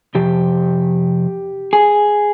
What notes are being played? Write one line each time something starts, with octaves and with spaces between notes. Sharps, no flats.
F2 C3 G4
G#4